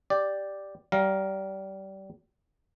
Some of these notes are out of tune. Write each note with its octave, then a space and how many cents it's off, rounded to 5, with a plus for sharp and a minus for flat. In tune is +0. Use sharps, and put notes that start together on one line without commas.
G4 +0 D5 +0
G3 -25 F5 +0 A#5 +20